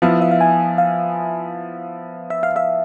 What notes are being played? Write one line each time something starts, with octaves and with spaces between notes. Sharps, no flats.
F3 B3 E4 F5
E5
F5
G#5
F5
E5
F5
E5